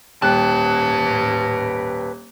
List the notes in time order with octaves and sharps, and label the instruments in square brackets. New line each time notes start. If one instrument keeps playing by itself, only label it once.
[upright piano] D#1 G5 F#6 [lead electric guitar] B4 A5